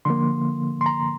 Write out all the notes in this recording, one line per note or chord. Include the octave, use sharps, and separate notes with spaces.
D3 F3 A#3 C6
C6
A#5